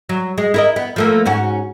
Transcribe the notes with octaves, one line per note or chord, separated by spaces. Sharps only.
F#3
G#3
E4 A#4 D#5
B3
F3 A3 A#3
G#2 C#4 F#4